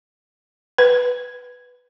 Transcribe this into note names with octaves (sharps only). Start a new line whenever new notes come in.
B4